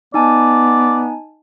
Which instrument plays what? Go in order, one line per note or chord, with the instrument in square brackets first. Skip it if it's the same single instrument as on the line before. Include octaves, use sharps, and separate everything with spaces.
[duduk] B3 [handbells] D#4 G#5 A5 [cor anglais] D5